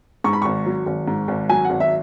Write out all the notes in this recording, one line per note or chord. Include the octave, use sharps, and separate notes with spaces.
G#2 C#6
B5
G#1 C#6
F#3
G#1
G#2
G#1
F#3 G#5
F#5
G#1
E5